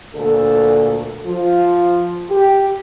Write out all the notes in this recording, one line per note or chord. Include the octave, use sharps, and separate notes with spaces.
D2 A#2 A4
F3 F4
G4